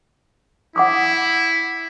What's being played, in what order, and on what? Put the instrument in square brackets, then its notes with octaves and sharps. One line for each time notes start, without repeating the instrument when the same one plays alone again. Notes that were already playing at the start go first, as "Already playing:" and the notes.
[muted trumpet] E4 [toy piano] F#5 D6 D#6